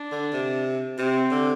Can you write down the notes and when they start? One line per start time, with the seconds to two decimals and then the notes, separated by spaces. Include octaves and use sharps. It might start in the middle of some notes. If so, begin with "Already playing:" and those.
Already playing: D4
0.12 D3
0.33 C3
0.98 C3 C4
1.31 D3